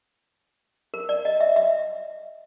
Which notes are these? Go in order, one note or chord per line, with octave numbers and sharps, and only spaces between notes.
A#4
D5
D#5
E5
E5